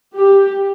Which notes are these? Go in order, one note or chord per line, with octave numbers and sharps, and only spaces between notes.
G4